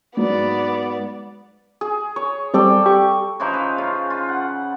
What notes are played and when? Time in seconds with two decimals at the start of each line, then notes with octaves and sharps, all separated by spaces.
0.17 G#2 F#3 B3 D5
1.81 G#4
2.16 C#5
2.54 G3 C4 A4 D5 G5
2.86 G4 C#6
3.40 C#3 E3 F3 D#4
3.54 B4
3.78 C#3 F4
4.10 F4
4.29 F#5